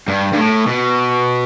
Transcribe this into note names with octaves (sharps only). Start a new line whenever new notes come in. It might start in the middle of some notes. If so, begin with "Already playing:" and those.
G2
G2
A2
B2